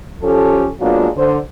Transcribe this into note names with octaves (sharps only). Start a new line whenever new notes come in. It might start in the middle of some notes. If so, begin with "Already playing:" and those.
F3 C#4 G4 A4
F#3 G#3 A#3 B3 D4 F4
D3 C5